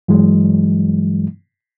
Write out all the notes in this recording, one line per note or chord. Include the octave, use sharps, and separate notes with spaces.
G2 E3 F#3 G#3